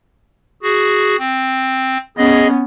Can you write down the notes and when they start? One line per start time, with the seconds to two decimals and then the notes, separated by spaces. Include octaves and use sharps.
0.63 F#4 G#4
1.19 C4
2.18 B3 C#4 G#4 D#5